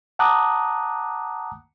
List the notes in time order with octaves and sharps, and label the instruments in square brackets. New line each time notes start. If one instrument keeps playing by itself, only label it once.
[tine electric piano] F#5 A5 A#5 D6 D#6 F#6